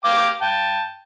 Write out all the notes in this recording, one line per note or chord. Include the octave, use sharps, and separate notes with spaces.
F5 G5 D6
G5 A5